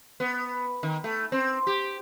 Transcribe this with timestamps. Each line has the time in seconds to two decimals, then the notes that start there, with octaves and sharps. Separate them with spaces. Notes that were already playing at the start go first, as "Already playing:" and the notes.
0.20 B3
0.83 D#3
1.04 A3
1.32 C4
1.67 G4